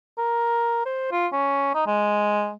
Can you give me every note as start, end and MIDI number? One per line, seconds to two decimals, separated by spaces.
0.18 0.85 70
0.86 1.07 72
1.12 1.27 65
1.33 1.74 61
1.75 1.83 63
1.87 2.52 56